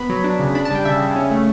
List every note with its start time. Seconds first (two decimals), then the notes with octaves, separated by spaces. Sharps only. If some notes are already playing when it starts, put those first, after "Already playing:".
Already playing: B3 B5
0.09 F#3
0.24 D4
0.39 C#3
0.55 D4 B5
0.65 A5
0.70 G3 G5
0.85 C#3 E5
1.00 C#3
1.16 C#4
1.31 A3